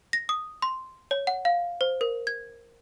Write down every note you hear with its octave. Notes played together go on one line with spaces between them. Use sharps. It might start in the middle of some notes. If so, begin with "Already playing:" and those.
A#6
D#6
C6
C#5
F#5
F5
C5
A#4
G#6